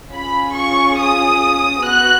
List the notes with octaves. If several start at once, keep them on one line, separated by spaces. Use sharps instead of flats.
C#4 F4 G#4 B5
C#6
D#6
B3 F#4 F#6